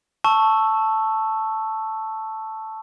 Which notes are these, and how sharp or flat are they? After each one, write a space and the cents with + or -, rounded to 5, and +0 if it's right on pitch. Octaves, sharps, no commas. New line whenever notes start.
A5 +0 C#6 +0 E6 +0